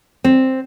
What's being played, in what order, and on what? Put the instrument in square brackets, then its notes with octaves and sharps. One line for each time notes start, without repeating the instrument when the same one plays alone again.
[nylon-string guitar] C4